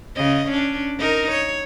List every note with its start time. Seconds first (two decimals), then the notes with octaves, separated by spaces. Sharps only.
0.16 C#3 D#5
0.48 C#4 D4
0.98 D#4 A#4
1.31 C#5